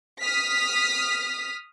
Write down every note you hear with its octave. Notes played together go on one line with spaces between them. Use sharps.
D#6 F6 B6